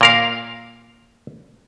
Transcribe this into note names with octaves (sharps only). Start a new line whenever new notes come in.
A#2 A#4 F5